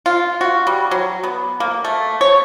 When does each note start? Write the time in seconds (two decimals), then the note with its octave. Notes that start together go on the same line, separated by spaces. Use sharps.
0.06 F4
0.41 F#4
0.67 G3
0.91 F#3
1.23 B3
1.60 A#3
1.84 A3
2.21 C#5